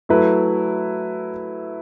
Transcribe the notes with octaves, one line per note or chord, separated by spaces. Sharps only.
F#3 A3 E4 B4